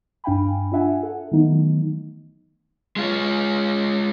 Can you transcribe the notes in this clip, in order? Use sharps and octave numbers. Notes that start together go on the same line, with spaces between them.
G2 D4 F5 G5 G#5 B5
D4 F4 E5 F#5 G#5
A4 F#5
D#3 E3 F#3 A3 B3 D#4
G#3 F4